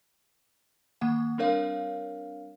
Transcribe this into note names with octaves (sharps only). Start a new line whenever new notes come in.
D#3 A#3 F#5
G3 C4 D4 A#4 C#5 F5